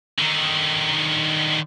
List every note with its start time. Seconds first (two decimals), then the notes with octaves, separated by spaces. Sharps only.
0.19 D3 D#3